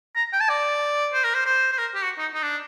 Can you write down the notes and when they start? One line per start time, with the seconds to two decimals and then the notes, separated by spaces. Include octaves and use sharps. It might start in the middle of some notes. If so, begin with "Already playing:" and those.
0.16 A#5
0.33 G5
0.41 A5
0.49 D5
1.13 C5
1.24 A#4
1.35 C5
1.46 C5
1.73 C5
1.78 A#4
1.95 G4
2.03 F#4
2.19 D#4
2.34 D#4
2.43 D4